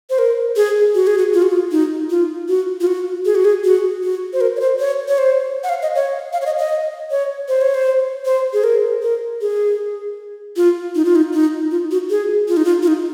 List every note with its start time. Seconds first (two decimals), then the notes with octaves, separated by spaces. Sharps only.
0.10 C5
0.19 A#4
0.56 G#4
0.95 F#4
1.07 G#4
1.18 F#4
1.34 F4
1.42 F#4
1.51 F4
1.72 D#4
2.10 F4
2.49 F#4
2.81 F4
2.87 F#4
3.25 G#4
3.35 F#4
3.45 G#4
3.64 F#4
4.03 F#4
4.33 C5
4.41 A#4
4.56 C#5
4.60 C5
4.80 C#5
5.08 C#5
5.18 C5
5.64 F#5
5.69 F5
5.82 D#5
5.95 C#5
6.33 F5
6.42 C#5
6.46 D#5
6.58 D#5
7.11 C#5
7.48 C5
7.61 C#5
7.74 C5
8.26 C5
8.53 G#4
8.64 A#4
9.03 A#4
9.41 G#4
10.57 F4
10.95 D#4
11.05 F4
11.16 D#4
11.33 D#4
11.71 F4
11.91 F#4
12.10 G#4
12.48 F4
12.57 D#4
12.65 F4
12.83 F4
12.87 D#4